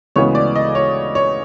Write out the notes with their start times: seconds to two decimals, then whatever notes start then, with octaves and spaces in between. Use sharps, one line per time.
0.16 D2 C#3 E3 G#3 B3 C#5
0.35 D5
0.56 D#5
0.75 C#5
1.15 C#5